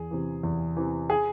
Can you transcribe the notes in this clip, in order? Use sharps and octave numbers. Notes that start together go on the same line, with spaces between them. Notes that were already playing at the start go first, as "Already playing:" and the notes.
Already playing: E2 G#4
C3 E3
E2
C3 E3
G#4